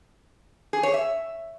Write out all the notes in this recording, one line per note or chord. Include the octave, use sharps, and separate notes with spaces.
G#4
C#5
E5